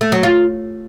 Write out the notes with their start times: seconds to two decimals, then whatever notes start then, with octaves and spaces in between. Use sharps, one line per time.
0.01 A3
0.12 F#3
0.23 F4